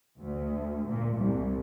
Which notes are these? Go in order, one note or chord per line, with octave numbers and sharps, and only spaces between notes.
D2
A#2
C2